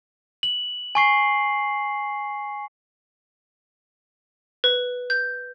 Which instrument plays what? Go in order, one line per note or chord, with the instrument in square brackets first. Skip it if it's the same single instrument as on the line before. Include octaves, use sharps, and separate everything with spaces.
[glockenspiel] F#7
G#5 C#6 C7
[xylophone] B4
G6